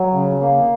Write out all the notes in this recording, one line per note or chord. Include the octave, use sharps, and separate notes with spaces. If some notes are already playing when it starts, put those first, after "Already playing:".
Already playing: F#3
C#3
A#3